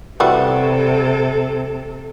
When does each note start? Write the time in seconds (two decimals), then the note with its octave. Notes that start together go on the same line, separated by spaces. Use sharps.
0.20 C3 E3 G3 F#4 A4